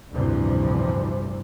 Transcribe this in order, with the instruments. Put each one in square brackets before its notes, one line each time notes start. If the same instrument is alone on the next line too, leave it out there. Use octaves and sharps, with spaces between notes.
[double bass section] A1 D2 G2 C3 E3 F3